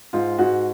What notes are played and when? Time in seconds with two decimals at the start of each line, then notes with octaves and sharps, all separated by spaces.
0.13 G#2 F4
0.38 G#2 F#4